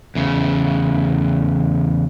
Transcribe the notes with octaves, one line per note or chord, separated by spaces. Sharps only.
E2 C#3